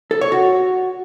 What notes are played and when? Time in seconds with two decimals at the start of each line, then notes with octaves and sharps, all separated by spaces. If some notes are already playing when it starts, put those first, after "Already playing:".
0.11 A4
0.21 C#5
0.32 F#4